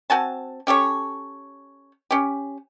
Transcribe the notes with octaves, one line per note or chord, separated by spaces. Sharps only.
C4 F#4 G#5 A5
C#4 G4 A4 C#5
C#4 G4